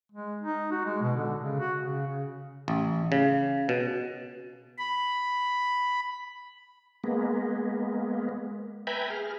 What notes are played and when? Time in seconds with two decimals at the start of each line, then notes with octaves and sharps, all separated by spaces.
0.12 G#3
0.42 D#4
0.71 F#4
0.85 G#3
1.02 B2
1.16 D3
1.41 C#3
1.60 F#4
1.81 C#3
2.07 C#3
2.68 A1
3.12 C#3
3.69 B2
4.78 B5
7.04 G#3 A#3 B3
8.87 B4 E5 G5 G#5 A#5 B5
9.10 G#4 F6